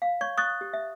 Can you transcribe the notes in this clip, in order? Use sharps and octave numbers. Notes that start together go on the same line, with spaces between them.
F5
C#5 C#6 G#6
C#6 D#6 F#6 A6
G4
E5